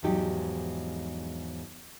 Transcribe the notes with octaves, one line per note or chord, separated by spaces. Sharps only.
E2 G#2 F3 F#3 D#4 G4